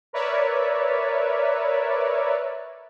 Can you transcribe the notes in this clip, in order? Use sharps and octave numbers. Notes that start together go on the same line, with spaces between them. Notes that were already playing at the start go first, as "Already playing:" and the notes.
A#4 B4 C#5 D5 E5